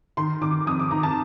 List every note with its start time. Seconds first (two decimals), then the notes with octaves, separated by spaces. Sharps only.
0.17 D#3 C6
0.41 D#3 D6
0.66 F2 D#6
0.79 D6
0.91 D#3 A#5
1.03 A5